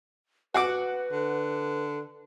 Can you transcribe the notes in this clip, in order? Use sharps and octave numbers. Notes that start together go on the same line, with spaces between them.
F#4 B4 F#5 D6
D3